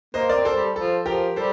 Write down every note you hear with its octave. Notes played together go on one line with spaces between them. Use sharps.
A#3 C5 D#5
A#4 D5
C4
A4 C5
G3
F3 A4
F3 G4 A#4
G3 A4 C5